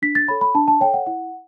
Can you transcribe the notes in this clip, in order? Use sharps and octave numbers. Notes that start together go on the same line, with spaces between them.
D4 B6
A6
A4 C#5 B5
B5
D4 A5
A5
A4 C#5 G5
F#5
E4 F#5